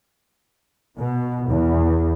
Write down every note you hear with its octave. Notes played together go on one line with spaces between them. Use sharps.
B2
E2